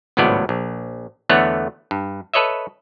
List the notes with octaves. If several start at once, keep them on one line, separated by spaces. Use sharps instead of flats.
G#1 C#2 A2 F#3 B3 D5
A#1
E2 D3 A3 B3 C#5 F#5
G2
A4 B4 C#5 D#5 E5